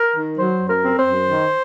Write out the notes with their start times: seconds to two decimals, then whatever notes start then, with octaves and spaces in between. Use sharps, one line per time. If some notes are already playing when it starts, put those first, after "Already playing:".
Already playing: A#4
0.16 D#3
0.38 F#3 C5
0.61 F#2
0.68 A#4
0.84 C4
0.98 C5
1.05 F#2
1.28 D#3